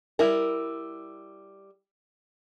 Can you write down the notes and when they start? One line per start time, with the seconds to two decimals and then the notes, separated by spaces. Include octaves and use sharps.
0.19 G3 E4 A#4